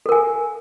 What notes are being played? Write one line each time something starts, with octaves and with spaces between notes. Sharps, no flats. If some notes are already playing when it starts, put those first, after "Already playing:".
A4 A#4 G#5